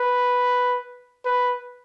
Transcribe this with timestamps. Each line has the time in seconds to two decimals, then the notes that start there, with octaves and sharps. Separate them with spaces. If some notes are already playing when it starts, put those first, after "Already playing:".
Already playing: B4
1.26 B4